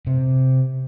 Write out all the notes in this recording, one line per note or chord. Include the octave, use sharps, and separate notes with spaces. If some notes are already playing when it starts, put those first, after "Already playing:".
C3